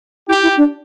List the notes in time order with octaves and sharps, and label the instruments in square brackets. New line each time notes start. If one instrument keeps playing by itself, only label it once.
[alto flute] E4 [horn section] G4
[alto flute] E4
D4